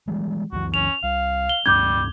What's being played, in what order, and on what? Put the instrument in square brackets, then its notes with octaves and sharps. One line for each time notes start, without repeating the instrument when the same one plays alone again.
[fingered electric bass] E3 G3 G#3
[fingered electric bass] C#2 F#2 E3 [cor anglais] F#4
[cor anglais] C#4 [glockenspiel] F7
[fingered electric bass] C2 [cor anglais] F5
[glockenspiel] G7
[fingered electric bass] C#2 G2 C#4 [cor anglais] G3 [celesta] D6 G6 G#6